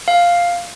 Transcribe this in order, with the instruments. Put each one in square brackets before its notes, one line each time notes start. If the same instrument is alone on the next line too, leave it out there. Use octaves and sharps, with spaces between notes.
[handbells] F5